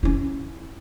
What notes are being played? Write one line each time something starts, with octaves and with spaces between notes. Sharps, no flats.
C#4 E4